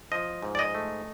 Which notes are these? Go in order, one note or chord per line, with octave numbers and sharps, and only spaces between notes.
F3 D#5
G#2
D5
D#5
A3